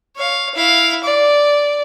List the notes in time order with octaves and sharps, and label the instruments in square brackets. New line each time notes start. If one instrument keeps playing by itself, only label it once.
[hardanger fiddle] C#5 F5
E4 F5
D5